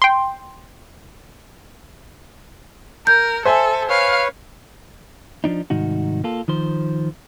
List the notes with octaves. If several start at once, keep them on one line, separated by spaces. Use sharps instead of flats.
G5 C6
A#4 G6
A4 C5 E5 G#5
B4 C#5 F5
F3 D4 D#4
C2 G#2 D#3 D#4 F#4
A#3 F4 A4
D#3 F3 C5